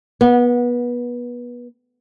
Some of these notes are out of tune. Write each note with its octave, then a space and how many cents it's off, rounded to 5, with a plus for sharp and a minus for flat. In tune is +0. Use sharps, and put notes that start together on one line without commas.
B3 -25